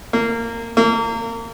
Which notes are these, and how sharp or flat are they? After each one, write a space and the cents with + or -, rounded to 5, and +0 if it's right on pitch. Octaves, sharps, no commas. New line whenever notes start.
A#3 -20
A#3 -30